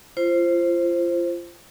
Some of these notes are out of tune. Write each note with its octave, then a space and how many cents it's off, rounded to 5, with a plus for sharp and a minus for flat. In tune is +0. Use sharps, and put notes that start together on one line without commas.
F4 -30 C5 +5